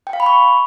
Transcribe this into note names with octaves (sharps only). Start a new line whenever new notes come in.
G5
F5
B5
C#6